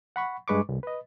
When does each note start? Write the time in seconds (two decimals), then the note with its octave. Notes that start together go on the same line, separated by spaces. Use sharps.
0.16 F#5 B5 C#6
0.48 G2 G#3 B4 C#6 D6
0.69 C2
0.83 B4 D#5